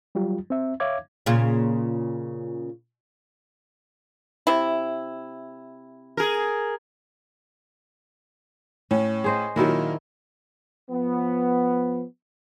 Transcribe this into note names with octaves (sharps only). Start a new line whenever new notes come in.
F#3 G3 F4 G4
C4 E5
C#5 E5 F5 D6 G#6
A#2 C#3 F4
C3 E4
G#4 A#4
A2 C#4
G#4 C5 D#5
A#2 D#3 F#3 E4 A#4
F3 B3